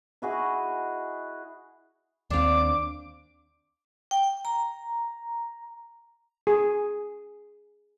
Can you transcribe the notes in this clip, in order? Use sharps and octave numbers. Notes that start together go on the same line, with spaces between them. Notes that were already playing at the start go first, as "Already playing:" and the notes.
E4 F#4 G#4 D#5
D#2 C4 D4 F5 D6
G5
A#5
G#4